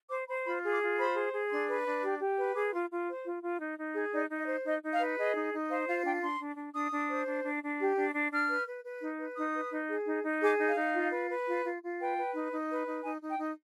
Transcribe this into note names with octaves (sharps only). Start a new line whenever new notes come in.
C5 D6
C5 B5
F4 B5
G#4
D6
F4
C5 B5
G#4
G#4
D4 C6
B4
D4
G4
G4
B4
G#4 D6
F4 C6
F4
C5
F4
F4
D#4
D#4
G#4
D#4 D5
D#4
D#5
C5
D#4 D#5
D#4
F5
B4
G#4 D#5
D#4
D#4
C5 F5
F4 F5
D4 G5
D4 C6
D4
D4
D4 D#6
D4
C5
D4
D4
D4
G4
D4
D4
D4 F6
B4
B4
B4
D#4
B4
D#4 D#6
B4
D#4
G#4
D#4
D#4
G#4 D6
D#4
F5
D#4
F4
B4
B4
F4
F4
F4
B4 G5
B4
D#4
D#4
B4
D#4
D#4 G#5
D#4
G5
D#4